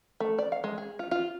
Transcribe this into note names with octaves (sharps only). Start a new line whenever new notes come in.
A3
D5
F5
G#3
G#4
F4
F4